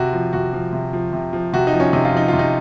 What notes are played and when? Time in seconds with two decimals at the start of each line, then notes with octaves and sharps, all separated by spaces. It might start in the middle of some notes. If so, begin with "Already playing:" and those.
Already playing: C3 F#4
0.13 F3
0.33 C3 F#4
0.53 F3
0.73 C3
0.93 F3
1.13 C3
1.33 F3
1.53 C3 F#4
1.67 D#4
1.73 F3
1.80 C#4
1.93 C3 D#4
2.05 F4
2.13 F3 D#4
2.28 F4
2.33 C3
2.39 D#4